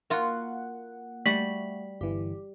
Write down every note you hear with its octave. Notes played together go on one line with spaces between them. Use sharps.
A#3 F4 F#4 F#5
G3 A3 F#4 B6 F#7
G1 E3 G4